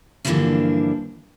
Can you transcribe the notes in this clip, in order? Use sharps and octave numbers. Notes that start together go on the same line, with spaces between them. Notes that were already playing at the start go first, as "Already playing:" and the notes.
G2 D3 E3 F3 A#3 D4